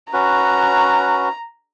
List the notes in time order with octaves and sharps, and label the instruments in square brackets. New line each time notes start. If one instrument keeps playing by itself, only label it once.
[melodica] C#4 F#4 B4 [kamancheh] A#5